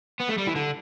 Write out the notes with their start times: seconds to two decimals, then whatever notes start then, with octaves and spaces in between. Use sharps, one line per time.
0.20 B3
0.29 A3
0.38 G3
0.48 E3
0.56 D3